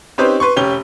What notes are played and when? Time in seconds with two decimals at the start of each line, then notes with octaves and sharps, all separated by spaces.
0.18 C4 C#4 D#4 G4 B4 C5
0.40 B4 C6 C#6
0.56 F1 C#4 G4 G7